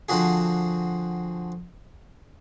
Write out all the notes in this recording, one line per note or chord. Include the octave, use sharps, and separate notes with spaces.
D3 F3 C4 F#4 G#4